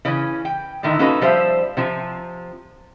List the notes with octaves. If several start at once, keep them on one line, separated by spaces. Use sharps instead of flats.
C#3 E3 C#4
G5
A2 D3 D#3 E4
A#3 C#4 D#4 F#4 A4 B4
F3 G3 C5 E5
C3 F3